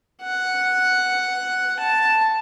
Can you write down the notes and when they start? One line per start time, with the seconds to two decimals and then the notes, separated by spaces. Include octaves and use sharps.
0.22 F#5
1.79 A5